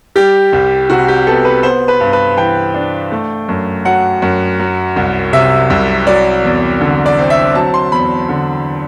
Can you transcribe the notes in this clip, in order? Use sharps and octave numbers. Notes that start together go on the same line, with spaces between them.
G3 G4
C2
C3 F#4
G4
B3 A4
B4
B3 C5
B4
G2
B4
E3 G5
D4
A3
F#2
F#3 F#5
F#2
F#3
C2
C3 E5
C2
F#3 D5
E2
D3
D5
C4
E5
F#3 A5
C6
E2 B5
D3